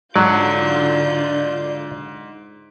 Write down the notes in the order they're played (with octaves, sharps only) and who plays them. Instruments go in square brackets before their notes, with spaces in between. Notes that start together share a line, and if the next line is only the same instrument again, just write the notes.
[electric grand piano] G#2 [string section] D3 F4 G6 [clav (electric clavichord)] F#3 [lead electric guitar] D5 F#5